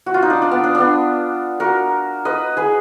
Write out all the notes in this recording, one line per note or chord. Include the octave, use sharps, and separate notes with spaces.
F#4
F4
D#4
D4
D4
B3
D4
B3 D4
F#4 A#4
B4 D#5
G#4 B4